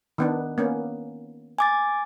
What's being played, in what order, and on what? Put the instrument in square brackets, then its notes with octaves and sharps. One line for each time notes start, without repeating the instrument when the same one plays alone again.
[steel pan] D#3 B3 D4
A#3 B3 C#4
[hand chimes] G#5 D6 A6